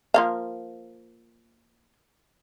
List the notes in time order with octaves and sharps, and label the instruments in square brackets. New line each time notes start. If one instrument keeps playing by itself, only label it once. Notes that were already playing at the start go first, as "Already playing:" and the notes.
[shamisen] F3 A#3 F5